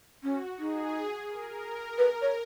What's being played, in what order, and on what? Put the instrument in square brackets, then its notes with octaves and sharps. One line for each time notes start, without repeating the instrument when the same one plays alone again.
[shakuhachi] C#4 [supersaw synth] F#4
[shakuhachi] D#4 [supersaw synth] G#4
[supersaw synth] A#4
[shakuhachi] B4
C#5